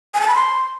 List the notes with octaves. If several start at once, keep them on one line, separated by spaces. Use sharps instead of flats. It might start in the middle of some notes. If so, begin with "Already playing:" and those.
G#5
A5
B5
C6